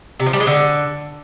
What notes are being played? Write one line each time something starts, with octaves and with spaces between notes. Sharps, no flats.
C3
F3
G3
G#3
D3